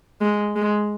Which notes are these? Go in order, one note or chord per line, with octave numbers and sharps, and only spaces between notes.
G#3
G#3